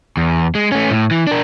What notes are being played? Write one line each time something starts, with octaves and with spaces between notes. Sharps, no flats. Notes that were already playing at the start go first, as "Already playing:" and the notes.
E2
G#3
A3 C#4
A2
E3
D4 A#4